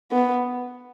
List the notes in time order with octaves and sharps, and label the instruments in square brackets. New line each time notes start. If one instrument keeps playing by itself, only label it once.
[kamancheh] B3